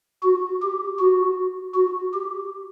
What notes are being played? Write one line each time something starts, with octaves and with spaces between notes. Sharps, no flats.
F#4
G4
F#4
F#4
G4